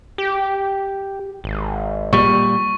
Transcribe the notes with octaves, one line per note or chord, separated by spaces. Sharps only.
G4
G#1
A#2 G3 C#6